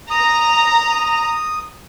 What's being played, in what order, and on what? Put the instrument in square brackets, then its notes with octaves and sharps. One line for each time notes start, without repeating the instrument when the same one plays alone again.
[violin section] A#5 [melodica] D#6